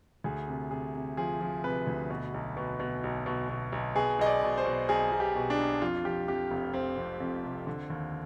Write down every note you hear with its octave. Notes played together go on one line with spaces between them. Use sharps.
D2 G#4
C3
C3 G#4
C3
F3 G#4
F3
C3 B4
D2
B2
B1
B2
B2
B1
B2
B2
B1
B2 G#4
B1 D#5
D5
B2
C5
B2
B1 G#4
B1
G4
B2
D4
B1
F2 F4
F3 G4
F2 G4
F1
F1 C4
F2
F2
C3
D3
D#2